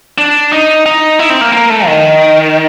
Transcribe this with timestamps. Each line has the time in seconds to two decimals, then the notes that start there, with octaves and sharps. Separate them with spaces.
0.18 D4
0.52 D#4
0.86 D#4
1.19 E4
1.30 C4
1.41 A#3
1.52 A#3
1.70 A3
1.86 D#3